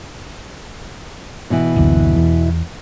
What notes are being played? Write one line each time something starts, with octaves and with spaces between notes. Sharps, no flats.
B2 E3
F#1 D2
E2